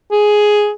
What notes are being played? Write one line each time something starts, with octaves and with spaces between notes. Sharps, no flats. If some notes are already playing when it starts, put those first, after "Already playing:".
G#4